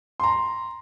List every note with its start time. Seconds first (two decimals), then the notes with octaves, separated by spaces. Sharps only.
0.20 A#5 C6